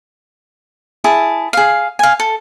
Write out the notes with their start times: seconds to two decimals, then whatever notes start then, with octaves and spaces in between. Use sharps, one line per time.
1.04 E4 G#4 A5
1.53 G#4 F5
1.99 F5 G#5
2.20 A4